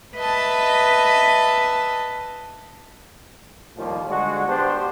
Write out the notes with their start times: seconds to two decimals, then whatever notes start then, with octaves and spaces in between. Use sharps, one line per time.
0.16 B4 D#5 E5 A5
3.77 D#2 A2 D#3 F3 G3 A#3
4.08 D3 G3 G#3 D4 F#4
4.47 B3 D4 G4 C5